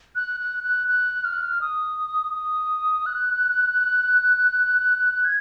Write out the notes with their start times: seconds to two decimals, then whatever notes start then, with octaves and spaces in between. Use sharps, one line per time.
0.16 F#6
0.40 F#6
0.64 F#6
0.88 F#6
1.25 F6
1.33 F#6
1.42 F6
1.61 D#6
2.34 D#6
3.06 F#6
5.25 G#6